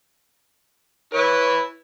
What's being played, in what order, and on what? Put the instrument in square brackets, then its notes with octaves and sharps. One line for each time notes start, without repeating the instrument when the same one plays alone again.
[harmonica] E4 B4 [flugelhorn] C#5